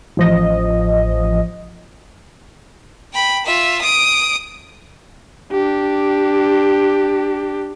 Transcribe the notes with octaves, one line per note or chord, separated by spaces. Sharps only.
A1 F3 D#5
G5 B5
F4 E5
D#6 D7
D4 G4